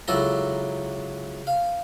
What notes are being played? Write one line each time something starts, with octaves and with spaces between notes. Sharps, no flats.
C#2 F#3 E4 A4 A#4 A#5
F5